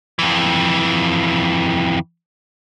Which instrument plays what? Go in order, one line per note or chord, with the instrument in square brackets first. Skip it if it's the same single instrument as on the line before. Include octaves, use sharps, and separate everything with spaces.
[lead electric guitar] F2 E3